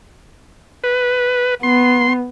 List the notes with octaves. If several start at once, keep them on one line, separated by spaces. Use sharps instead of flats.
B4
B3 C6